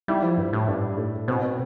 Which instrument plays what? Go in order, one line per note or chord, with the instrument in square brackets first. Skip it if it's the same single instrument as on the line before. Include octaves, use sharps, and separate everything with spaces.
[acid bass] G3 [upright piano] E4
[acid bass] F3
G2
A2
[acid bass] G2 [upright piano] D4
[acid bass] A2
[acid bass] B2 [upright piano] C4
[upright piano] C4